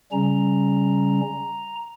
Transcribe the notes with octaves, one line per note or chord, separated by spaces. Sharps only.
C#3 G3 C#4 A#5